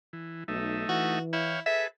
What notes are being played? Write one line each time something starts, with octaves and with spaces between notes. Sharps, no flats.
E3
B1 A3 D#4 E5
E3 F#4
E4 C#5 F5 G5
G#4 A4 B4 E5